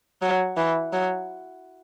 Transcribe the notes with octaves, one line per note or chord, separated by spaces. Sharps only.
F#3
E3
F#3